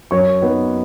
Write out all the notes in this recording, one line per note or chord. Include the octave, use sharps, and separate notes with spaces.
F#2 C#5 C#6
F#3 B3 D#4